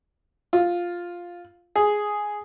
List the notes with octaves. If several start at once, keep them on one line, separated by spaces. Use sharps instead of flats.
F4
G#4